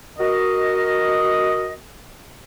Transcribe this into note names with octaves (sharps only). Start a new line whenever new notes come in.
F#4 A#4 D#5